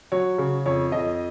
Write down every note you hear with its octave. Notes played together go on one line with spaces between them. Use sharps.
F#3 C#5
C#3
F2 C#5
F2 D#5